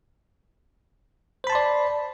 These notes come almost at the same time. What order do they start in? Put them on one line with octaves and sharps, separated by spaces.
C5 B5 A5 C6 D5